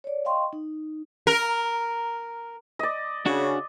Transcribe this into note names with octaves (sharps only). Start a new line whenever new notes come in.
C#5 D5
D#5 F5 G5 C6 C#6
D#4
A#4
D5 D#5
C#3 D4 F#4